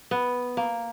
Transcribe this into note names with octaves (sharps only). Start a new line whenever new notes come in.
B3
A#3